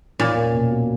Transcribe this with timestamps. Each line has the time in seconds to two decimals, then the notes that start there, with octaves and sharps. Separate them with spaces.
0.19 A#2 C#4
0.37 A#3
0.54 B2
0.72 B2